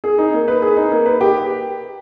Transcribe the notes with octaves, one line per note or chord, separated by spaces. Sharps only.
G#4
D#4
A#3
B4
G#4
D#4
A#3
B4
G4